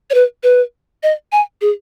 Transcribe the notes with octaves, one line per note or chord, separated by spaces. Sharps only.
C#5
B4
B4
D#5
G#5
G#4